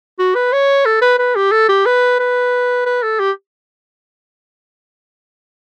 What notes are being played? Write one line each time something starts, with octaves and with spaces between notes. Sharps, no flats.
F#4
B4
C#5
A4
B4
B4
G4
A4
G4
B4
B4
B4
A4
G4